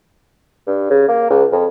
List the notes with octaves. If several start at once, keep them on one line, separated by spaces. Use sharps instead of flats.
G2
C#3
A#3
C#2
F2